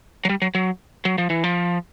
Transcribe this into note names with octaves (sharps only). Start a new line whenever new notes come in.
F#3
G3
F#3
F#3
F#3
F3
E3
F3